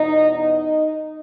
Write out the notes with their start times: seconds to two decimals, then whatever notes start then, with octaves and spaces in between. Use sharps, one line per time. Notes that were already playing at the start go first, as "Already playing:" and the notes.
Already playing: E2 B2 D#4 D#5
0.34 D#4 D#5